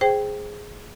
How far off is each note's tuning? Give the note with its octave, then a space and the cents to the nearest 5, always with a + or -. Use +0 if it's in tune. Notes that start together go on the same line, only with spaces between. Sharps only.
G#4 +0 C5 +0 G5 +0